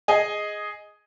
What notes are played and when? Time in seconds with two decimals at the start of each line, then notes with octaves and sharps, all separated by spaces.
0.08 G#4 D#5 G#5